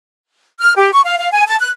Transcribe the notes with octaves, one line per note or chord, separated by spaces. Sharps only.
F6
G4
C#6
F5
F5
G#5
A5
F#6